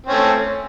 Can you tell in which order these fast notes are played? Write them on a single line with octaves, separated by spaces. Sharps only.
C4 C#4 A3